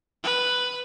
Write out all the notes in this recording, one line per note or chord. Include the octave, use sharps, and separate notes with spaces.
B4